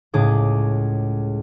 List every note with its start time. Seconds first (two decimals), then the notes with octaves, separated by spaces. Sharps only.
0.14 C#2 A2 G#4 D6